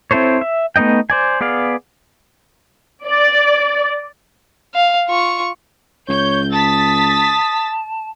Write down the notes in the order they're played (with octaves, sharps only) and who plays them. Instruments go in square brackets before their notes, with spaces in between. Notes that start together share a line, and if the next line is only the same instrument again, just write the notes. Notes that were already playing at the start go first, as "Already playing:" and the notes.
[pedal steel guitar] C4 E4 A4 C5 C#5
E5
A3 B3 D#4 D#5 G5
C5 D5 G#5
B3 G#4 D5 F5
[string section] D5
[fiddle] F5
F4 C#6
[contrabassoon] C#2 [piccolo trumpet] C#5 [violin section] G6
[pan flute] A5 [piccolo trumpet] D#6 [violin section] A6 B6